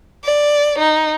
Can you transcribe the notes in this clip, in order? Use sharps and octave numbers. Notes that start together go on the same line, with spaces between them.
D5
D#4